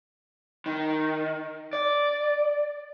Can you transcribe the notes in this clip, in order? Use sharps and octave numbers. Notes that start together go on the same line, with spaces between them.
D#3
D5